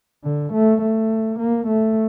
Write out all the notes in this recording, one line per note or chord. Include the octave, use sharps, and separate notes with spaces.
D3
A3
A3
A#3
A3